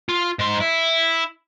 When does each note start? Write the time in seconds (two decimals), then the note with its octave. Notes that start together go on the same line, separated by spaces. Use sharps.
0.09 F4
0.39 G#2 C6
0.60 E4